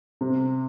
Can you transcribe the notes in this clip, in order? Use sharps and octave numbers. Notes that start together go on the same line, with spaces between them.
C3